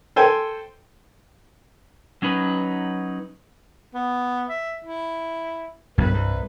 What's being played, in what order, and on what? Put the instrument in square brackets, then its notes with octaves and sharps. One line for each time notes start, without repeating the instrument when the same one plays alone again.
[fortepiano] A4 C5 G5 G#5
[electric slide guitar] F#3 C#4 D#4 B4
[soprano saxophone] B3
E5
E4
[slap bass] F#1 B1 [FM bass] G2 [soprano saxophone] B4
[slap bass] C2